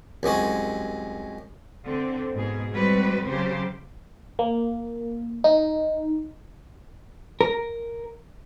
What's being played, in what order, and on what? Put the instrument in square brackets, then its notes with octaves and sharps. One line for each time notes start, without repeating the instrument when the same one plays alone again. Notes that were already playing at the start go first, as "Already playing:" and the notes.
[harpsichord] C2 F#2 G#3 F#4
[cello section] D3 C4
G#2 B2 G#4
G3 G#3 C4 F#4 B4
C#3 F#3 G4 C5
[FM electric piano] A#3
D#4
[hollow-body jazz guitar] A#4